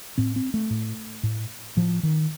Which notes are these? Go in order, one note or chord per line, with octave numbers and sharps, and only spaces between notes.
A2 C4
C4
A3
A2
A2
A2 F3
D#3